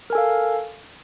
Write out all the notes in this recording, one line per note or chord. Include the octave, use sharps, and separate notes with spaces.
A4 A#4 F5 G#5